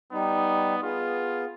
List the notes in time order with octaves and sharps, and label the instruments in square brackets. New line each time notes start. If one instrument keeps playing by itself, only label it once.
[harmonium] G3 D#4 [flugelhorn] B3
[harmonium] B3 G#4 [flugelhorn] F4